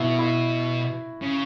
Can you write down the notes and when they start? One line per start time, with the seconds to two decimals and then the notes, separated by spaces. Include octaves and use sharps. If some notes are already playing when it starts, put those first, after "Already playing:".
Already playing: B2 E4 F#4
0.19 E4
1.22 C#3